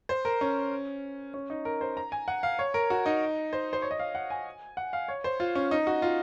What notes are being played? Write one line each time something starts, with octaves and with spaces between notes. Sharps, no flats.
C5
A#4
C#4
C#4
D#4
A#4
C5
A#5
G#5
F#5
F5
C#5
A#4
F#4
D#4
C5
C5
C#5
D#5
F5
F#5
G#5
F#5
F5
C#5
C5
F4
C#4
D#4
F#4
F4